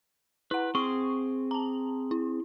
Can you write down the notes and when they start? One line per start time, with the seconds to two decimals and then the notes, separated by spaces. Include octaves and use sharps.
0.51 E4 B4 F#5
0.75 C4 G#4 C6 C#6
1.51 A5 A#5
2.11 E4